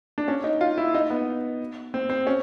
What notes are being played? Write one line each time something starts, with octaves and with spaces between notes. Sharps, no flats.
D4
C#4
D#4
F4
E4
D#4
B3
C4
C4
C#4